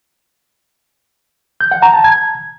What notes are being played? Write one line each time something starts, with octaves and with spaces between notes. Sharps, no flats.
G6
F#5
A#5
A5
G#6